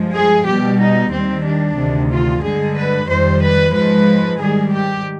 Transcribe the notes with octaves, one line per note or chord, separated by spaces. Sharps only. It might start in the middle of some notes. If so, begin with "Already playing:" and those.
Already playing: G2 F3 G#3
G#4
B2 G3 G4
D#4
D#2 D#3 G3 C4
D4
D2 C3 D#3
F4
G2 D3 G#3 G#4
B4
F2 D#3 G3 C5
B4
G#2 F3 G#3 B4
G#2 D#3 G3 G#4
G4